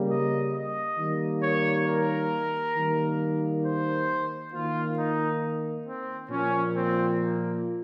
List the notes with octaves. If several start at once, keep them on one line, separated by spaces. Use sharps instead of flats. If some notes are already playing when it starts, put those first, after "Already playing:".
Already playing: C#3 G3 A#3
D#5
D#5
D#3 G3 A#3
C#5
A#4
D#3 G3 A#3
C5
D#3 A#3 F4
D#4
C4
A#2 F3 A#3 C#4
C4
A#3